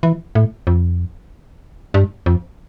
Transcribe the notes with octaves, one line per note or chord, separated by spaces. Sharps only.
E3
A2
F2
G2
F2